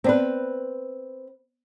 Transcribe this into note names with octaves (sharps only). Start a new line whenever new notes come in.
B3 C4 B4 C5 D5